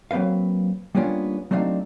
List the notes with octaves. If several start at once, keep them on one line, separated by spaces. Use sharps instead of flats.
F#3 A#3 C4 B4 F5
G3 A#3 B3 C#4 D4 F4
F#3 A3 C4 D4 D#4 F5